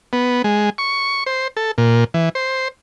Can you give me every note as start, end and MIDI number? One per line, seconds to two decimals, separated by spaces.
0.13 0.42 59
0.44 0.70 56
0.78 1.24 85
1.26 1.48 72
1.57 1.71 69
1.78 2.04 46
2.14 2.29 52
2.35 2.68 72